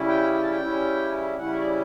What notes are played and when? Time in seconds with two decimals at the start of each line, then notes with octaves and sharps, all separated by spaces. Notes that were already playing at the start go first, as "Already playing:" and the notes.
Already playing: C#3 G3 C#4 E4
0.08 G5
0.34 G5
0.42 A5
0.50 G5
0.60 C#3 G3 C#4 E4
1.38 C#3 G3 C#4 E4 F#5
1.53 C#5
1.57 D5